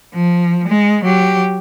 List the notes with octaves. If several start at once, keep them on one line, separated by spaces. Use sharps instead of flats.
F3
G#3
F#3 G4